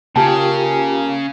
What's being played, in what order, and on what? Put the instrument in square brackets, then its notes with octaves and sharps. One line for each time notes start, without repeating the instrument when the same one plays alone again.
[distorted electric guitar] C#3 [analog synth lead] A#3 [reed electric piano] F4 G4 G5 [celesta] A5